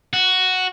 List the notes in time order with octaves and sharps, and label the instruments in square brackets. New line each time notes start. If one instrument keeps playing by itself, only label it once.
[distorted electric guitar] F#4